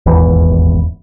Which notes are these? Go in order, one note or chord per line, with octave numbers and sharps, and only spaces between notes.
D#1 G#1 E2 E3